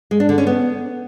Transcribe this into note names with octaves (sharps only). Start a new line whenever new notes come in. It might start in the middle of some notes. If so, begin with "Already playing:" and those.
G#3
D4
D3
C#4
B3